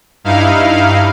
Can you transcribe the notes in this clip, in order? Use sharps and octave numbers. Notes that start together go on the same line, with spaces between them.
G2 D#4 E4 F5